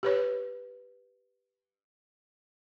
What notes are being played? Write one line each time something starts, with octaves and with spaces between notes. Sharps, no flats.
G4 B4 C#5